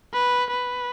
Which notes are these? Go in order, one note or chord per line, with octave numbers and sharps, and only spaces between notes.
B4
B4